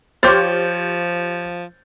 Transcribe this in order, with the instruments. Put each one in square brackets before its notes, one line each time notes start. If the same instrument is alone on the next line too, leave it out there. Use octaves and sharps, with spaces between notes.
[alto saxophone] F3 [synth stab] F4 G4 [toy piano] C5 [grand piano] C#5 G6 A6